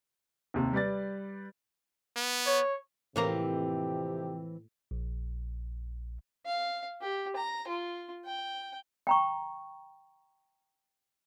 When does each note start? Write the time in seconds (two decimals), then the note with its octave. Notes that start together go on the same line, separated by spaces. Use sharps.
0.54 D#2 C3
0.73 G3 B4 D5 A6
2.16 B3
2.46 C#5
3.16 F2 A2 C3 E3 A#3 C4 G4 A#5
4.91 A#1
6.46 F5
7.02 G4
7.36 A#5
7.68 F4
8.25 G5
9.07 G5 A#5 C#6